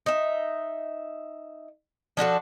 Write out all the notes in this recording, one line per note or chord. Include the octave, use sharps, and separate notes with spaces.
D#4 E5
F3 D4 F#4 A4